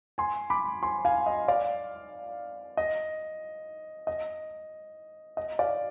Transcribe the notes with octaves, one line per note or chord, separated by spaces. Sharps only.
G#5 C6
B5 D6
G#5 C6
F5 G#5
D#5
D5 F5
D#5
D#5
D#5
D5 F5